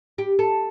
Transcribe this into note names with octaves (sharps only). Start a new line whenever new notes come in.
G4
A4